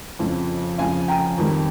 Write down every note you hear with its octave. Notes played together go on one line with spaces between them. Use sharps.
F2 C#3 F3
F2 C#3 F3 F5 G#5
G5 A#5
F2 D#3 G3